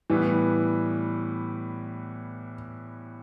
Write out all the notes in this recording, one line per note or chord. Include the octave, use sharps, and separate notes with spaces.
A2 E3 G3 B3